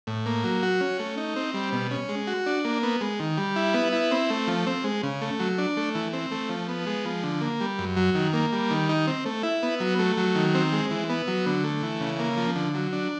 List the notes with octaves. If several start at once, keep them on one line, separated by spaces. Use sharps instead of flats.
A2
A#3
F#3
F#4
C#4
A3
D#4
C4
G3
B2
C#4
G#3
F#4
D4
A#3
B3
G#3
D#3
G3
E4
B3
E4
C4
A3
F3
C4
G#3
C#3
A3
F#3
D4
A3
E3
C4
A3
F3
B3
G#3
F3
D3
A#3
G3
F#2
F#3
D#3
A#3
G3
D#3
D#4
C4
A3
E4
B3
F#3
A3
F#3
D#3
C4
G#3
E3
B3
F#3
D3
A3
E3
C#3
A#3
F3
D3
F#3
D4